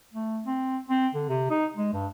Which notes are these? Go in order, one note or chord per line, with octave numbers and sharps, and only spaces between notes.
A3
C4
C4
D3
C3
D#4
G#3
G2